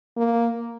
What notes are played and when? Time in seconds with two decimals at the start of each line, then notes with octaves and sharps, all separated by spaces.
0.17 A#3